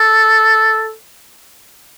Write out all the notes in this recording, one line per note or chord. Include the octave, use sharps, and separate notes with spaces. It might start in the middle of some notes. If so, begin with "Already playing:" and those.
Already playing: A4